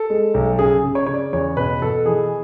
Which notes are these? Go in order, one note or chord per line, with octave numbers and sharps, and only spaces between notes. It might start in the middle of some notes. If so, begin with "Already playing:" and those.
Already playing: A4
G#3
B1
C#3 G#4
C#3
C#5
C#3 C#5
D5
E2 C#5
B2 B4
B2 A4
E3 G#4